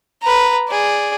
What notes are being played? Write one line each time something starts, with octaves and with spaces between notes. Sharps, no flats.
B4 A#5
G#4 D5